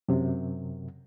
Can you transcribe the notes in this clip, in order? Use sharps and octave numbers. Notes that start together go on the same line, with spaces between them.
F#2 C3